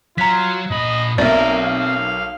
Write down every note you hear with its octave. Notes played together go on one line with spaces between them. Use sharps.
F#3 F4 A#5 B6
A#2 D#5 B5
B1 A#3 C4 A#4 D5 E5
F5